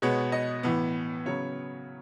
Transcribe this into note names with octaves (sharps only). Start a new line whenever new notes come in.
B2 G#3 B3 C#5
D#5
A2 E3 B3
C#3 F#3 B3 C#5